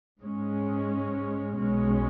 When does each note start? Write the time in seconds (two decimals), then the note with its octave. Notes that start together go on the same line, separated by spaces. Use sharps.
0.21 G#2 G#3 C#4
1.58 B1 B2 G#3 C#4